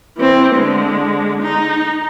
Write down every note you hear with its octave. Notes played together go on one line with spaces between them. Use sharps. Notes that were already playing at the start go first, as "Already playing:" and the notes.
E3 C4
D3 G#3
D#4